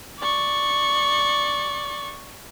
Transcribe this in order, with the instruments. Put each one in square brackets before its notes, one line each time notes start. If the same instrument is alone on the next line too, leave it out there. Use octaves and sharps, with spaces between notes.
[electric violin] D5 C#6